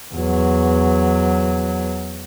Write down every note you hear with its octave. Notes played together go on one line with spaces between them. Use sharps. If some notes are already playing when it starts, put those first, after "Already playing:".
E2 F#3